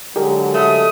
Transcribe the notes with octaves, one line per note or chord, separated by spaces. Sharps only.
D3 F#3 G#3 G4 G#4 A#4
A3 D#6